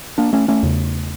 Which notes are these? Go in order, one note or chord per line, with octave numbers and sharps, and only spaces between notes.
A#3 D4
A3 C#4
A3 C#4
E2 C#3